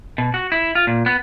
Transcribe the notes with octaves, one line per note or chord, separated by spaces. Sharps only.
B2
F#4
E4
F4
A#2
B3